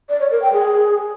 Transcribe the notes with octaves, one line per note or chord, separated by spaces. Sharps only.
D5
C#5
A#4
G5
G#4